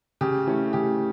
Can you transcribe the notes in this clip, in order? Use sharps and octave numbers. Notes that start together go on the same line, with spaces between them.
C#3 G4
E3 A3 C#4
C#3 G4